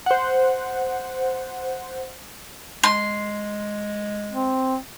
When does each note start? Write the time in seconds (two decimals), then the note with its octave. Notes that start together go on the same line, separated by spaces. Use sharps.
0.06 C5 F#5
2.83 G#3 C6
4.31 C4